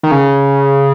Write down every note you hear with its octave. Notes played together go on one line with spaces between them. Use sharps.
D#3
C#3